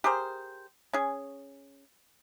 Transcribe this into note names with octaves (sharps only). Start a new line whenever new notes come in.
G4 G#4 A#4 C5
C#4 G#4